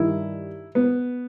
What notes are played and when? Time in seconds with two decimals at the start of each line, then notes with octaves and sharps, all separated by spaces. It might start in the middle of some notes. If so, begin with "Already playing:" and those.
Already playing: G2 D#3 E4
0.75 B3